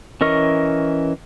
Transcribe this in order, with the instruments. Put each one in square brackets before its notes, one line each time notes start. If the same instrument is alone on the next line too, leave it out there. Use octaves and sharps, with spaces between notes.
[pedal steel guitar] E3 C#4 A#4 D#5 C#6